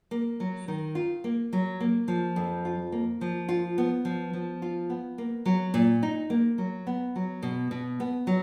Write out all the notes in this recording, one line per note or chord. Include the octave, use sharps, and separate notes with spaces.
A#3
F#3
D#3
F4
A#3
F#3
A#3
F3
F2
F4
A#3
F3
F4
B3
F3
F3
F4
B3
A#3
F#3
A#2
D#4
A#3
F#3
B3
F#3
B2
B2
B3
F#3